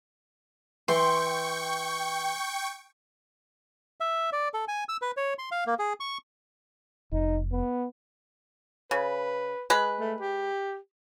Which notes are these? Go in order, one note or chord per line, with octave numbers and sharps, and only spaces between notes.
E3 G5 C6 C#6
E5
D5
A4
G#5
E6
B4
C#5
C6
F5
A#3
G#4
C#6
F1 D#4
B3
C#3 B4
G#3 B4
A3
G4